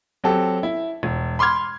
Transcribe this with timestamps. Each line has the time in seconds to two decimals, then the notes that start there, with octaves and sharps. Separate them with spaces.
0.24 F#3 C4 G4 A4
0.63 E4
1.03 E1
1.39 B5 C6 D6 F6 G#6